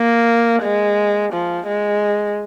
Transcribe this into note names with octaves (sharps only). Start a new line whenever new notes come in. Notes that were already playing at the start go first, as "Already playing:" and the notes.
Already playing: A#3
G#3
F3
G#3